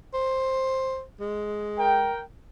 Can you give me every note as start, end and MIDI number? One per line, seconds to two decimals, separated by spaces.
0.14 1.02 72
1.20 2.12 56
1.77 2.22 70
1.77 2.22 79